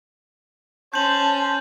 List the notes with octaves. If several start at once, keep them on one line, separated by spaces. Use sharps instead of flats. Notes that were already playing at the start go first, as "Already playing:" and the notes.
C#4 C5 A5 G6 F#7